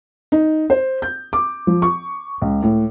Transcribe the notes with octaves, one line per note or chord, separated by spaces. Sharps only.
D#4
C5
G6
D6
F3
C#6
C#2
A2